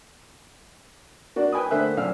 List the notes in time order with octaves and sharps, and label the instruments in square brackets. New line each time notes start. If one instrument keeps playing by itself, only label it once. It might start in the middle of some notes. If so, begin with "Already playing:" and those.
[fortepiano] A#3 D4 F#4 D5
B4 G5 G#5 B5 D#6
D3 A3 A#3 C5 E5 F#6
F#2 A#2 F5 E6 F6